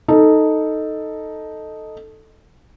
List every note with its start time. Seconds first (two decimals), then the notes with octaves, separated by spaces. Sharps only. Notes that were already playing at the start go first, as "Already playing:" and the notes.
0.08 D#4 A4